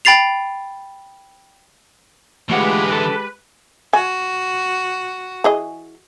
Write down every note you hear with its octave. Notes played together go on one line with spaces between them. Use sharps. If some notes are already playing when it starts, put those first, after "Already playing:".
G5 B5 A6 C7 F7
D3 E3 G#3 A3 F4 G4 B4 F#5
A4
F#4 G#5
E3 G#4 D#5